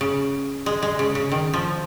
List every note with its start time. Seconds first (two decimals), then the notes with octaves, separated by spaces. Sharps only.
0.01 C#3
0.66 G#3
0.83 G#3
0.99 C#3
1.15 C#3
1.32 D#3
1.54 F3